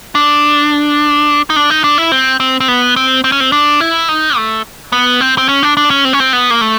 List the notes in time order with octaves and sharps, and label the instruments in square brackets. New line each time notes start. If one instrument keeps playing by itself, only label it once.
[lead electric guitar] D4
D#4
D4
D#4
D4
E4
C4
C4
C4
B3
C4
C4
C#4
C4
D4
E4
D#4
A3
B3
C4
C4
C#4
D4
D4
C#4
C4
C#4
C4
B3
A#3
A3